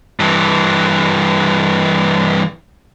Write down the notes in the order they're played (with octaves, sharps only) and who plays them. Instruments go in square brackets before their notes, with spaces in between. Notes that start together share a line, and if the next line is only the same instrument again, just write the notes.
[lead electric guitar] G2 E3